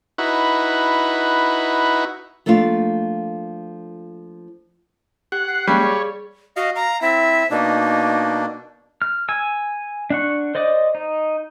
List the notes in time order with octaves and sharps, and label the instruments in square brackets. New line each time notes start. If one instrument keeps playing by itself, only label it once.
[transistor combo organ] D#4 E4 F#4 B4
[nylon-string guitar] F3 A3 A#3 D4 F4
[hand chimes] G4 [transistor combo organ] F#5
[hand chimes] C7
[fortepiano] G3 [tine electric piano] G#3 A#3 C#4 [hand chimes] G#4 F5 [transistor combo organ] C#5
[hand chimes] G#4 [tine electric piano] D5
[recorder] F#4 [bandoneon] D#5 F5
[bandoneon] F5 [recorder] A#5
[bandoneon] C4 E4 [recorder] E5
[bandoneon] B2 A#3 D4 [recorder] D#4
[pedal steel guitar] F6
G#5 E6
D4 F#5 C#6
C5 D5 D#5 D6
D#4